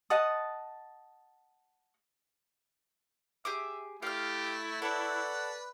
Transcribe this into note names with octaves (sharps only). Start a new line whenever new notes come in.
D#5 F#5 A5 D#6
G4 G#4 E5 D6
A3 E4 G4 F5 F6
A4 B4 C#5 D5 F#5